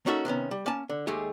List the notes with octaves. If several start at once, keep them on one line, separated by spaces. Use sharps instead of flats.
A#3 C#4 D#4 F#4 A4 E5
C3 D#3 B3 C#4
G3
A#3 C#4 G#5 A5
D3
D#2 G#3 A3 G4 G#4